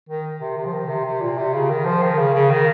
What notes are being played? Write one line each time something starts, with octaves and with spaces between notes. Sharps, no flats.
D#3
C3
C3
F3
D#3
C3
C3
A#2
C3
C#3
D#3
F3
D#3
C#3
C#3
D#3